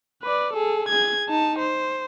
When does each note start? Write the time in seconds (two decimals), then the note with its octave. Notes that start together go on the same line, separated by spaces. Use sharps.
0.22 B4 D5
0.53 G#4 A4
0.89 G#4 G#6
1.29 D#4 A5
1.59 C5